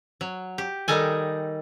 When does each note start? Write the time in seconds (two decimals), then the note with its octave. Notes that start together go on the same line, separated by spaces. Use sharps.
0.21 F#3
0.58 G4
0.88 D#3 G3 D#4 A4 G#5